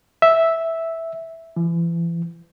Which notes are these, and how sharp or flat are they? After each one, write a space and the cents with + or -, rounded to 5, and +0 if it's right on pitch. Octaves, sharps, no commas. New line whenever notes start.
E5 -5
E3 +35